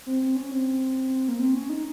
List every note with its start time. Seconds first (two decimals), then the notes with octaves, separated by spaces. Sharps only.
0.06 C4
0.22 C4
0.36 C#4
0.52 C4
1.28 A#3
1.39 C4
1.54 C#4
1.69 D#4